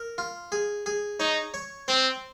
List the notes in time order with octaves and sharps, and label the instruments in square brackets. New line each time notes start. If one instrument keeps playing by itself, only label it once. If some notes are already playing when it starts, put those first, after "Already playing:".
Already playing: [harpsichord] A#4
F4
G#4
G#4
[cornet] D#4 [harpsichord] C#5
[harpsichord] C#5
[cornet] C4 [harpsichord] C5